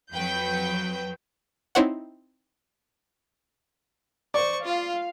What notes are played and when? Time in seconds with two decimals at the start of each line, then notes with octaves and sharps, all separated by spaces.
0.12 F2 F#3 B4 G5 G6
1.75 C4 D#4 E4 C5 C#5 F#5
4.34 C5 D5 C#6
4.65 F4 F5